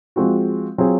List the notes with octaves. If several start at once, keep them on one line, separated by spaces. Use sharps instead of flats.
F3 G#3 C4 F#4
F#3 C4 F4 G#4